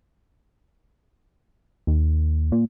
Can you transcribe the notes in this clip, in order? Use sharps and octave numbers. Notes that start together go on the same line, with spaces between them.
D#2
A#2